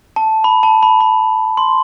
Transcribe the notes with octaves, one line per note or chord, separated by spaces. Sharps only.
A5
B5
A5
B5
B5
C6